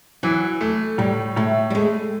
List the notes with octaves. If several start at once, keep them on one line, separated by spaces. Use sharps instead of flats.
E3 F#3
A3
A2 G3
A2 A3
G3
G#3 A3